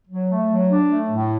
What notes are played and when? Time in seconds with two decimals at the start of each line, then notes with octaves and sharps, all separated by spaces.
0.08 F#3
0.30 A3
0.50 F#3
0.70 D4
0.91 A3
1.10 A2